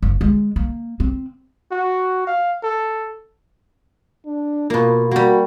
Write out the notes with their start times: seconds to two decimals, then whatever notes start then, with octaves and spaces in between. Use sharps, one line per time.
0.02 F#1
0.21 G#3
0.56 A#3
1.00 C4
1.72 F#4
2.27 F5
2.63 A4
4.26 D4
4.70 B2 A#3 F4
5.11 G3 A#3 F#4